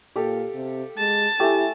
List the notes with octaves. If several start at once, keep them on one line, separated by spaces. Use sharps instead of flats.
A#2 G4 A4 F5
C3
G#3 A5
A3 E4 G4 G#5